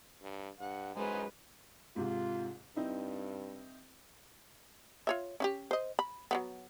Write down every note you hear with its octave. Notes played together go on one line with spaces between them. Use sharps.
G2
G2 F#5
F#2 G#3 D#4 B4 C5 G#5
G#2 C3 F4
G2 C4 D#4 E4
F4 C#5 E5
C#4 E4 G4
C5 D#5
B5
F#3 A3 B3